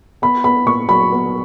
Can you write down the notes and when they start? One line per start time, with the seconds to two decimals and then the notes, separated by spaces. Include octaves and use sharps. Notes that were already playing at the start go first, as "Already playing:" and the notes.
0.22 B3 B5
0.44 B3 B5
0.66 A#2 C#6
0.89 F#3 B5
1.12 B3